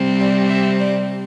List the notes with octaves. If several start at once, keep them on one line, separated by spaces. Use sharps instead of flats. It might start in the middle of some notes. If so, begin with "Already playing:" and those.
Already playing: C3 G3 C4
D5
E5
D5